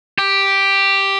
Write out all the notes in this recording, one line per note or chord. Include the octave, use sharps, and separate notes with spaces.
G4